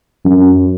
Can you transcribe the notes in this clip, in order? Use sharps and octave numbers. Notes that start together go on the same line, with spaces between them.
F#2